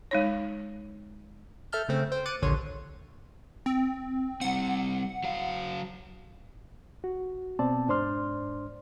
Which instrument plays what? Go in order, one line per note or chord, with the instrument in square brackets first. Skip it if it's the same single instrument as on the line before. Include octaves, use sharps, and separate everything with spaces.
[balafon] G#3 D#4 C#5
[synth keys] A4 E5 A5 F6 G6
C#3 A3 C4
C5 G5
D6 F#6 A6 C#7 D#7
A#1 D#2 D3 C#5 C6 D#7
[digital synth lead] C4
[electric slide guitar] G3 C4 [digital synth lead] F#5
[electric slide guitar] F#3 F5
[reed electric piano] F#4
B2 B3 C4 D5 A5
G#2 D4 C5 D5 C6 F6